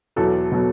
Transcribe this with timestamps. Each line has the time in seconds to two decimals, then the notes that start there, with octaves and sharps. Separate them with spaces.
0.16 E2 B2 F#3 A4
0.52 B2 F#3